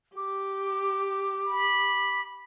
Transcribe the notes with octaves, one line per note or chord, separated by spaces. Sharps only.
G4 D6
B5